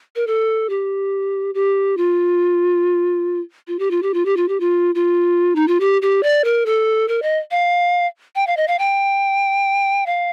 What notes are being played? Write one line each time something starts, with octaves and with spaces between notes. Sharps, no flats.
A#4
A4
G4
G4
F4
F4
G4
F4
G4
F4
G4
F4
G4
F4
F4
D#4
F4
G4
G4
D5
A#4
A4
A#4
D#5
F5
G5
F5
D#5
F5
G5
F5